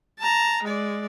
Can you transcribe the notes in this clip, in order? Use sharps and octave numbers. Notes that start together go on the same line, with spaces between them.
A5 A#5
G#3 D5